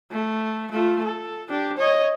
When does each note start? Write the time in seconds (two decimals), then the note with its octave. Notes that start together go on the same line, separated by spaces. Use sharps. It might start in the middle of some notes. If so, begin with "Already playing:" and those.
0.12 A3
0.71 A3 F4
1.04 A4
1.49 D4 G4
1.78 C#5 D#5